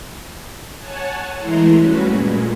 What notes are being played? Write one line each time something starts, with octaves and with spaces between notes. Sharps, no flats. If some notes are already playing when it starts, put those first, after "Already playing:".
C#5 F#5 G#5 A5
E3 G#3 A3 E4 A#5 C6
G2 A3 C#4 F#4 B4
A#2 G#3